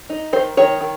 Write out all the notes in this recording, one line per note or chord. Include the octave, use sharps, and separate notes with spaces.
D#4
D#3 C5
D#3 C#5
D#3